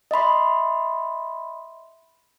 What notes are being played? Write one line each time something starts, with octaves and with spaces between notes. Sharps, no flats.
D#5 E5 B5 C6